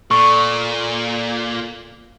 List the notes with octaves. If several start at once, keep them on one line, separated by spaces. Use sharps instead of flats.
A#2 A4 D5 C#6